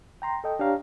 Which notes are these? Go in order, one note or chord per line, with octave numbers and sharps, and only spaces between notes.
G5 A#5 C6
A4 D#5 G5
D4 G4 C#5 F5 A#5